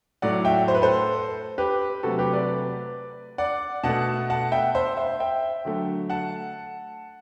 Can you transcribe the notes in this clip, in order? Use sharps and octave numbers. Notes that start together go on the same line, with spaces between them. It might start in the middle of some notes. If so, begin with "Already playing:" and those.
A2 F#3 A3 D5 F#5
E5 G5
C5
B4
A4 C5
G4 B4
C3 F#3 A3 F#4 A4
G4 B4
B4 D5
D5 F#5
B2 A3 F#5 A5
F#5 A5
E5 G5
C5 E5
C5 E5
E5 G5
D3 F#3 A3
F#5 A5